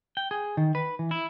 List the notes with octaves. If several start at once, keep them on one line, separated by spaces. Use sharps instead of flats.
G5
G#4
D#3
B4
E3
E4